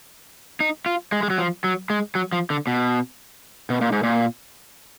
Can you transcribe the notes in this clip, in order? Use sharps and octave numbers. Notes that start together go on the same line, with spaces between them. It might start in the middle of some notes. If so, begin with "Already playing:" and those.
D#4
F4
G#3
G#3
F#3
F3
F#3
G#3
F#3
F3
D3
B2
B2
A#2
G#2
A#2